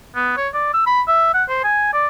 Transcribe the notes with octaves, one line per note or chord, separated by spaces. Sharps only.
B3
C#5
D5
E6
B5
E5
F#5
C5
G#5
D5